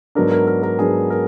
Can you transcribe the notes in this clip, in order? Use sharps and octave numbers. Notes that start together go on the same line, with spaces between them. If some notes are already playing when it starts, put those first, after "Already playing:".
G#2 F#3 B3 D4 A#4
A#4
A#4
A#4
G#2 F#3 B3 D4 G#4
A#4